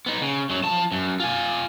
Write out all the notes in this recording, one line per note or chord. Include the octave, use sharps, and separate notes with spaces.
B3 D#4
C#3
F#2 F#3
F3 A5
F#2
F4 G#5